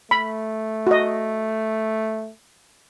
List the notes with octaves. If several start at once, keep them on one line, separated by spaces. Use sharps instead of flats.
A3 B5
F#4 D#5